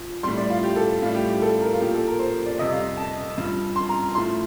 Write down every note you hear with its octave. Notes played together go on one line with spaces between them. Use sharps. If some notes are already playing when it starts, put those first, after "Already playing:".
Already playing: F3
A2 G3 C6
D5
F4
G4
A4
A2 G3 F4
G4
G4
A4
A#4
F4
A#2 F3 G4
A4
A#4
C5
D5
F2 C3 G3 D#5
F5
A5
G2 F3
C6
A#5
A2 F3 C6